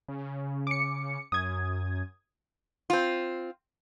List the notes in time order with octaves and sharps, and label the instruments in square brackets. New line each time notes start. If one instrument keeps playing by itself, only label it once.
[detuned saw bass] C#3
[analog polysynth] D6 C#7
[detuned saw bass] F#2 [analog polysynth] D#6 G#6
[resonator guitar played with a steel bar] C4 F4